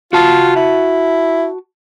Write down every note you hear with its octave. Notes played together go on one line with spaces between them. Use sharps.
F4 F#4 A5
E4